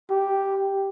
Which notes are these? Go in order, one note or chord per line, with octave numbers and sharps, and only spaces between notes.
G4